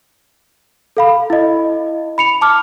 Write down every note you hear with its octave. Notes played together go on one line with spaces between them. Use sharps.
A4 F5 B5
E4 D#5
B5 C#7 F7
A5 D6 F6